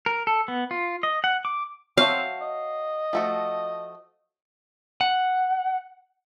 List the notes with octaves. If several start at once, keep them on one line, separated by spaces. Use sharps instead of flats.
A#4
A4
B3
F4
D#5
F#5
D6
C4 F#4 C#5 E5 F5 A5 C#6
D#5
F3 A3 F#4
F#5